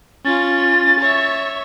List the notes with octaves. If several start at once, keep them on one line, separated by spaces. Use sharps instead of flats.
C#4 F4 A6
C#5 E5